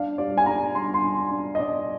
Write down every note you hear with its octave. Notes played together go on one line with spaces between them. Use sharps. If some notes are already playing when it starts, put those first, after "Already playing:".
Already playing: D4 F5
G3 D5
G#5
D4 A#5
D4 C6
C6
D4
D4
D#5
D4 D5